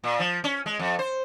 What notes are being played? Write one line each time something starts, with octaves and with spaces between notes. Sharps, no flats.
A#2
F3
C#4
G#3
F2
C5